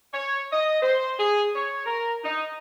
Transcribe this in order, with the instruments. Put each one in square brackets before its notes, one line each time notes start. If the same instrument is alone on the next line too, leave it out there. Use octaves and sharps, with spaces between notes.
[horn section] C#5
D#5
C5
G#4
C#5
A#4
D#4